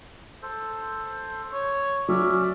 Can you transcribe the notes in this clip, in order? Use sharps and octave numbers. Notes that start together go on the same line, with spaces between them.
A4 C5
C#5
F#3 C#4 D5 E5